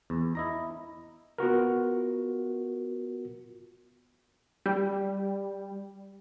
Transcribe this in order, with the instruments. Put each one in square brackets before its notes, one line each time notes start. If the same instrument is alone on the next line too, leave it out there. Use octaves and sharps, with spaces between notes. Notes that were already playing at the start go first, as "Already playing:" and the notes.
[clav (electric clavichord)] E2
E4 D#5 A#5
[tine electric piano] B3 F4 F#4 A#4
[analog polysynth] G3